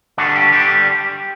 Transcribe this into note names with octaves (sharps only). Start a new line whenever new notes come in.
D3 G3 D4 F#4
G4
D3 G3 D4 G4